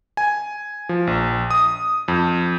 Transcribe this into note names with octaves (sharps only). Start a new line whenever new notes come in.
G#5
F3
A#1
D#6
F2